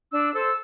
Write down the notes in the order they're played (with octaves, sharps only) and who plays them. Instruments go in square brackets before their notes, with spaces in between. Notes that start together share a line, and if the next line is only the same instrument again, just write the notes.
[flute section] D4 E6
A4 C5 E6